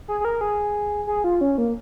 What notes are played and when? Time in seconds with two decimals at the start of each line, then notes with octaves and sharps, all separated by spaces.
0.08 G#4
0.20 G#4
0.25 A#4
0.41 G#4
1.07 G#4
1.24 F4
1.41 C#4
1.58 A#3